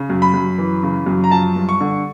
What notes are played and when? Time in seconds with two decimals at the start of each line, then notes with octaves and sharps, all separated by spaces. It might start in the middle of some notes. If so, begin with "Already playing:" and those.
Already playing: C#3
0.10 F#2
0.22 B5
0.34 F#2
0.58 E3
0.83 C#3
1.06 F#2
1.24 A#5
1.31 F3 A5
1.56 G2
1.69 C#6
1.81 D3